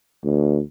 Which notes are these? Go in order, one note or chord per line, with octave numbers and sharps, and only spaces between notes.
D2